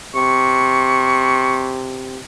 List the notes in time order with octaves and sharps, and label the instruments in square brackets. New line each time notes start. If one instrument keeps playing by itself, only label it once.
[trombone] C3 [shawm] C#6